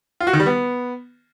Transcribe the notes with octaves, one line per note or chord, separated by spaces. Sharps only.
F4
F#4
D#3
G3
B3